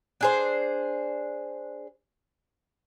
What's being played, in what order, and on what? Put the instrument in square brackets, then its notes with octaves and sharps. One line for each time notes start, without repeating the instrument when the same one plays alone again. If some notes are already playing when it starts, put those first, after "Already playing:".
[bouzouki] D4 G#4 C5